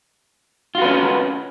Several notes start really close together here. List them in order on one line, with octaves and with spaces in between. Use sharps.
F4 F#4 B4 C#4